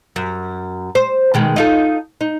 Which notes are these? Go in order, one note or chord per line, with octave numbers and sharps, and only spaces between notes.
F#2
C5
B2 D#3 G#3
D#4 F4 A4
D#4